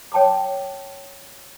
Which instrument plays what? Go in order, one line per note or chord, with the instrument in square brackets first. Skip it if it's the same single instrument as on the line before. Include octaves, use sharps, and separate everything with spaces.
[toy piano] C#5 G5 A5 C6 D6